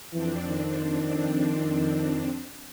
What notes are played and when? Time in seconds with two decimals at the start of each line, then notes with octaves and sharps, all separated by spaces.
0.12 F2 E3 C4 D4
0.47 D#3